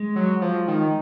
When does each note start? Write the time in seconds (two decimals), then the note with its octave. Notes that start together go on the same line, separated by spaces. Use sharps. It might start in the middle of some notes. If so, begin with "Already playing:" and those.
Already playing: G#3
0.16 F#3
0.42 F3
0.68 D#3